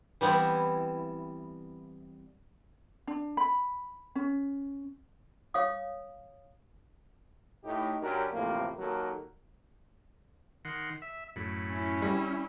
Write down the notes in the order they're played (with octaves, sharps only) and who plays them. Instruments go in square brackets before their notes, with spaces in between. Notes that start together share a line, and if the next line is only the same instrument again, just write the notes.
[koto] E3 G3 B3 C4 E4
[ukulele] D4
B5
C#4
[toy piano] C#5 F5 D#6
[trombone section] A2 D#4 G4
F#2 F#3 C#4 D4 G4 A#4
A1 A2 C3 F3 A#3
D#2 F#3 A4 A#4
[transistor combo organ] D#3 F#5 C6
E5
F#2 A2 B5
[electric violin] C#4 E4
[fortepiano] G3